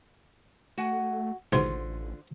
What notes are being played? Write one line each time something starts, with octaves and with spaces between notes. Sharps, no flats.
A3 F#4 F#5 G#5
A1 G#2 B2 D3 F4 C5 C6